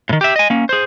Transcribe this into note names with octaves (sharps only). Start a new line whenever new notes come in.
A2 D#3
G4 E5
D#5 G#5
A#3 C#4
G#4 C5